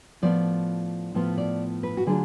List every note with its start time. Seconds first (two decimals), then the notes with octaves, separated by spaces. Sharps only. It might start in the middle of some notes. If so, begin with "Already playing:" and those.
0.22 A2 F3 B3 F4 D5
1.14 A2 F3 B3 F4
1.38 D5
1.83 B4
1.97 F#4
2.07 D3 F#3 A3 D4 F4 G#4